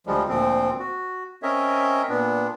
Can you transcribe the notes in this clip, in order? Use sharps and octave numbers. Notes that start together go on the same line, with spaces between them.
D2 F3 G3 G#3
D2 A#2 F3 C4
F#4
C4 C#4 A#4 C#5 D#5 E5
A#2 B3 D4